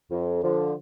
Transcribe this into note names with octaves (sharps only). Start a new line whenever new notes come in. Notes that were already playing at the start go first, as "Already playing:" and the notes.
F2
D3 F3